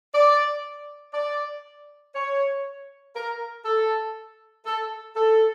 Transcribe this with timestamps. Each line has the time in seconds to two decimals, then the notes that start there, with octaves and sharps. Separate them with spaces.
0.14 D5
1.14 D5
2.16 C#5
3.16 A#4
3.65 A4
4.66 A4
5.17 A4